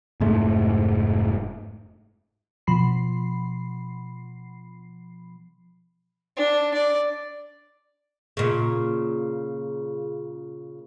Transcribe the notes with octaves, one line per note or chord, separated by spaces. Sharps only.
F1 G#2 A3
B2 F3 B5 C7
D4
D5
A#2 C#3